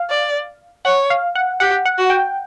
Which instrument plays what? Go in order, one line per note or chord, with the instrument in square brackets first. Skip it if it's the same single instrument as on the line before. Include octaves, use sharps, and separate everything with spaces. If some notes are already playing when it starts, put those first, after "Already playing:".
Already playing: [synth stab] F5
[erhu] D5
[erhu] C#5 [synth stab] F#5
[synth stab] F5
F#5
[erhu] G4 [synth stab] F#5
[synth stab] F#5
[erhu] F#4
[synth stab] G5